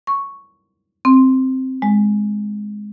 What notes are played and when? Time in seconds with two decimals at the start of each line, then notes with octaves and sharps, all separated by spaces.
0.07 C#6
1.05 C4
1.82 G#3